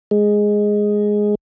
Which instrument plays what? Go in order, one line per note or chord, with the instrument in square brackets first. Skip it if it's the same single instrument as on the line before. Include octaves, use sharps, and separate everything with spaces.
[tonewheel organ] G#3